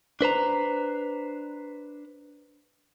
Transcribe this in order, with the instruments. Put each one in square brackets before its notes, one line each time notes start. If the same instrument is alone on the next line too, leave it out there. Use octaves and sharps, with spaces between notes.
[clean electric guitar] D4 B4 C5 A#5